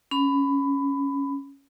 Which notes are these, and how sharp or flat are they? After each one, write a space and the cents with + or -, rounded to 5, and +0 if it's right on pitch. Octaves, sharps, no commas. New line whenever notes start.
C#4 +0 B5 +20